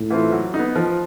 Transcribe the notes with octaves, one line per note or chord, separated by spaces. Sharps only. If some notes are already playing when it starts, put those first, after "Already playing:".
Already playing: A2
E3 A3 C4 F4
F#3
D#4
B3
F3